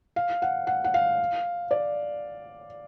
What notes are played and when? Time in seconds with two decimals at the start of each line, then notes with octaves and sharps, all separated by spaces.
0.16 F5
0.42 F#5
0.67 F#5
0.84 F#5
0.94 F5
1.71 D5